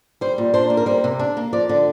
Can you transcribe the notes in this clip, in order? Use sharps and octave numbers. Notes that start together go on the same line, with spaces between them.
G3 C5
A#2
D4 C5
A#3
A#4
G3 C5
C3
D4
A#3
F3 D5
D3